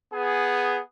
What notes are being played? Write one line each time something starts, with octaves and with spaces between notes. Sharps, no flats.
B3 G#4